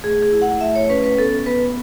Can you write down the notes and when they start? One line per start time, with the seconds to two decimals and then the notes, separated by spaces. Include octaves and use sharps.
0.04 A3 G#4
0.23 G#4
0.32 E4
0.42 F#5
0.61 A3 E5
0.75 C#5
0.89 C#4 B4
1.04 B4
1.18 B3 A4
1.46 B3 B4